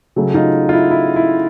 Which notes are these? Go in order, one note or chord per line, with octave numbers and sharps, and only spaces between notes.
C#3 F#3 A3
D#4 F4
F4
E4
E4
E4